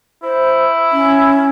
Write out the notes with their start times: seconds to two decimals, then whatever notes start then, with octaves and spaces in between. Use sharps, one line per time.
0.23 E4 C5
0.92 C#4